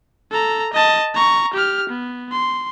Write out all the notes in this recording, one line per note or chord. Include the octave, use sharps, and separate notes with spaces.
A4 A#5
D#5 A5
A#5 C#6
G4 F6
B3
C6